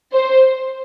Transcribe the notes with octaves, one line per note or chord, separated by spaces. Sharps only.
C5